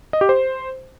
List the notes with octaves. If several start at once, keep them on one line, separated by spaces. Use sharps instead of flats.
D#5
G4
C5